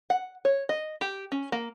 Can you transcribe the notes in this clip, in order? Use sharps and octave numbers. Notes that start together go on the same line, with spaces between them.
F#5
C#5
D#5
G4
C#4
A#3